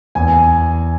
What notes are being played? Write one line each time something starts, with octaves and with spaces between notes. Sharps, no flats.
E2 G#5